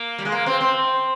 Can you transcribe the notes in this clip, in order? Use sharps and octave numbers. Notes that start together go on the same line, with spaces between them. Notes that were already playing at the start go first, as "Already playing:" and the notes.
Already playing: A#3
G3
G#3
A#3
C4
C4